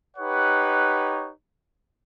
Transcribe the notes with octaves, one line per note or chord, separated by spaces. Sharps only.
D#4 G4 B4 C#5 F#5